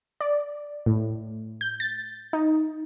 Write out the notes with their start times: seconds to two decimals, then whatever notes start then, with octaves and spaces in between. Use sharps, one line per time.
0.21 D5
0.86 A2
1.61 G6
1.80 A6
2.33 D#4